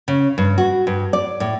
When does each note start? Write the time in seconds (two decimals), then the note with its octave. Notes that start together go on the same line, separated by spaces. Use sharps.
0.08 C#3
0.38 G2
0.58 F#4
0.87 G2
1.13 D5
1.40 A2